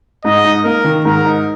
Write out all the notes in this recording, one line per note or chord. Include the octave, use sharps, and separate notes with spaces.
G#2 D#5
D#4
A#3 A#4
D#3
G#2 A#4
D#4